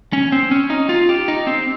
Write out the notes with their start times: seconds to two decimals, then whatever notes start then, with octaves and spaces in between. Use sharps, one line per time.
0.13 C#4
0.32 C4
0.51 C#4
0.70 D#4
0.89 F4
1.09 G4
1.28 D#4
1.47 C4